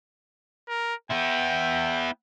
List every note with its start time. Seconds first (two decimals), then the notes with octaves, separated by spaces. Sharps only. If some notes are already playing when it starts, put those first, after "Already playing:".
0.68 A#4
1.11 B3 E4 G5